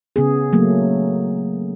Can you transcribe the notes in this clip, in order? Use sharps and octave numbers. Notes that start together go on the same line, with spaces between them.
C#3 B3 G#4
F#3 A3 A#3